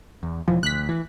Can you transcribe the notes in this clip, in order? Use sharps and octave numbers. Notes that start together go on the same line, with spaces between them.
E2
E1 E3 F3
D2 F#6 B6
E3